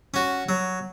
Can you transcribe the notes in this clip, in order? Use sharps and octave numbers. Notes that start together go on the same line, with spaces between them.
C#4 F#4
F#3